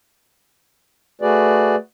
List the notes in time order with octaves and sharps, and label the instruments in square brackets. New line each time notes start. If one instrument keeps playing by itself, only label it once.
[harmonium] A3 F#4 G#4 B4 D5